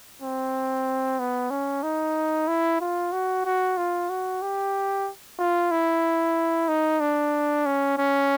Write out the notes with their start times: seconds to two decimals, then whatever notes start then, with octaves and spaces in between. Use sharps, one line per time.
0.22 C4
1.19 B3
1.50 C#4
1.83 D#4
2.48 E4
2.81 F4
3.12 F#4
3.45 F#4
3.77 F4
4.10 F#4
4.42 G4
5.39 F4
5.71 E4
6.68 D#4
7.00 D4
7.66 C#4
7.98 C#4